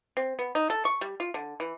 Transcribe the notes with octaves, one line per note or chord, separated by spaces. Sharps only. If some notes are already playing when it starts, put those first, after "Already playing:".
C4
B3
D#4
A4
C#6
G3
F4
D3
E3